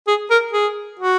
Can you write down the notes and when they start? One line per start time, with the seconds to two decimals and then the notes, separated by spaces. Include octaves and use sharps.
0.07 G#4
0.30 A#4
0.53 G#4
1.00 F#4